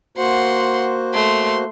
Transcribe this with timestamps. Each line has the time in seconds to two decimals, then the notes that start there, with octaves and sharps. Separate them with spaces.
0.17 A#3 F#4 C5 F#5 C6
1.14 A3 C6